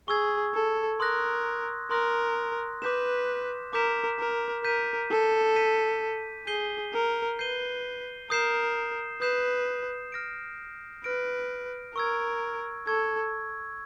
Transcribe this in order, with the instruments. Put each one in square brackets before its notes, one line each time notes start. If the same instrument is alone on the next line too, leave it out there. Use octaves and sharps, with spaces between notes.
[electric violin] G#4 [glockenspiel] C#6 E6 G#6
[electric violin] A4
[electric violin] A#4 [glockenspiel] C6 D#6 F#6 A#6
[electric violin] A#4 [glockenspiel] C6 D#6 F#6 A#6
[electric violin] B4 [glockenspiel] D6 G6 B6 E7
[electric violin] A#4 [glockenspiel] D6 G6 B6 E7
[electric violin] A#4
[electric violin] A#4 [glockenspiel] G6 B6 D#7
[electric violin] A4
[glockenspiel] G6 B6 D#7
[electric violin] G#4 [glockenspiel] G6 C7 D#7 G7
[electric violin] A#4
[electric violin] B4 [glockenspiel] G6 C7 D#7 G7
[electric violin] A#4 [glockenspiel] D#6 G6 C7 E7
[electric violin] B4 [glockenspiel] D#6 G6 C7 E7
[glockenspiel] F6 A#6 D7
[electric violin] B4 [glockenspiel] F6 A#6 D7
[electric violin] A#4 [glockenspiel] C#6 E6 G#6
[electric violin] A4 [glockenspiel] C#6 E6 G#6